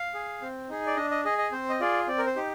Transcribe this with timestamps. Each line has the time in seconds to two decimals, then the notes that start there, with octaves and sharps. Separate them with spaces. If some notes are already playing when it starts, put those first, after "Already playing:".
Already playing: F5
0.14 G#4
0.42 C4
0.69 D#4 G#4
0.86 D5
0.96 D4 D#5
1.11 D#5
1.25 G#4 D#5
1.38 D#5
1.52 C4 C5
1.69 D#5
1.80 F4 G#4 D5
2.08 C4 D5
2.18 A#4
2.26 C5
2.36 D#4 G4